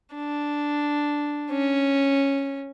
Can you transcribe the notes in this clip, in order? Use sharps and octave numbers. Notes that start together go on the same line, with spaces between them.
D4
C#4